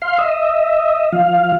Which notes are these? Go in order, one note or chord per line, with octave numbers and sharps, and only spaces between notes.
F5 C6
D#5 E5
F3 F5